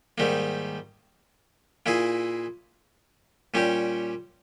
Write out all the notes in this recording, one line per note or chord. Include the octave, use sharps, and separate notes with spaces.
G#2 D#3 G3 A#3
A#2 A#3 E4 G#4
A#2 G3 C#4 G4